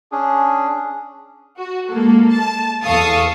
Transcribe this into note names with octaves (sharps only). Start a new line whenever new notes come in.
C#4 D4 G#4
F#4
G#3 A#3 A4
A5
E2 A4 F5 C#6 D#6